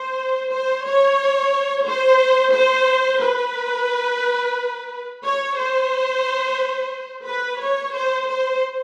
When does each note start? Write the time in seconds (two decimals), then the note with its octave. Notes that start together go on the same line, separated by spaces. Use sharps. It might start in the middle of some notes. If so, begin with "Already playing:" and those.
Already playing: C5
0.52 C5
0.86 C#5
1.87 C5
2.54 C5
3.22 B4
5.24 C#5
5.57 C5
7.26 B4
7.60 C#5
7.94 C5
8.27 C5